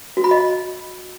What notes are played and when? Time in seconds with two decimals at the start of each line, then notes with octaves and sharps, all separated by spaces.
0.17 F#4
0.24 B5
0.31 D#5